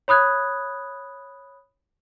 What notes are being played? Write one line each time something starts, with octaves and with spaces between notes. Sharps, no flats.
C#5 B5 D#6 F#6 G#6